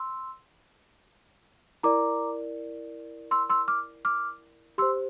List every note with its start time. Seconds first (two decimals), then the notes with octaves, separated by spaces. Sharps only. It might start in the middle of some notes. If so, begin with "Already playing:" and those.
Already playing: C6 E6
1.83 E4 A#4 D5 A#5 D6
3.31 C6 E6
3.50 C6 E6
3.68 D6 F6
4.05 D6 F6
4.78 G4 C6 E6
4.82 C5